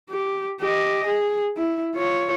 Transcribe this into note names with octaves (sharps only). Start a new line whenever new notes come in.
G4
G4 D#5
G#4
E4
F4 C#5